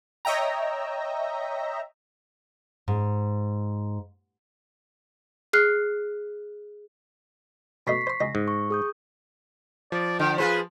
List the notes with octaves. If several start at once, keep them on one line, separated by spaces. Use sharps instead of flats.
C#5 D#5 E5 G5 A#5
G#2
G#4 F6 F#6 C7
B2 A3 D#5 C#6 B6 C7
C5 C6
C#2 D#5 A#6
G#2
C#6
G#4 D#6 G6
F3 D5
D3 G5
F4 G#4 B4 C5